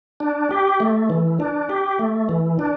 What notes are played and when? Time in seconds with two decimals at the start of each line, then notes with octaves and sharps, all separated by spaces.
0.20 D4
0.51 G4
0.80 A3
1.10 E3
1.40 D4
1.69 G4
1.99 A3
2.29 E3
2.59 D4